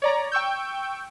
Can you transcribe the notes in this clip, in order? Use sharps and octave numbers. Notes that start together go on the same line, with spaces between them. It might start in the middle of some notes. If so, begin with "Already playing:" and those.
C#5 D5 A#5
G5 C#6 E6 G6